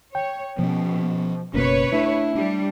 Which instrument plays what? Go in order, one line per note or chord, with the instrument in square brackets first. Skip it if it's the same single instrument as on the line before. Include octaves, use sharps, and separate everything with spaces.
[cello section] C#5 [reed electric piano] G5
[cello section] B2 [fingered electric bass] F3 C#4
[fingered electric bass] F#1 [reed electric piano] B2 A#3 C#4 [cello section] B4 C#5
[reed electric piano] A3 [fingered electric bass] D4 [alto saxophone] E4
[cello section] G3 [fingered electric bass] D4